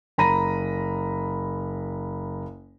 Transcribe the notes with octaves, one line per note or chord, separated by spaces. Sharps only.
F#1 A#5 B5 A#6 D#7